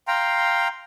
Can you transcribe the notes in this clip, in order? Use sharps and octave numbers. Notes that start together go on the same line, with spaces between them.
F5 G5 A#5 C6